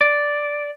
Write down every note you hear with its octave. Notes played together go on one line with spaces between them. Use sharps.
D5